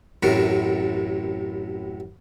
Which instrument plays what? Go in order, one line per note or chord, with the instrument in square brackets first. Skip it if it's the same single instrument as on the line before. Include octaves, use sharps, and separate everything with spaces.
[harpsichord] A1 F#2 A2 C3 F#4 A#4